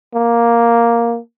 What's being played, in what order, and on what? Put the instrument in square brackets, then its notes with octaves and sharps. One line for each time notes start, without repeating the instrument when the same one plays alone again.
[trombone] A#3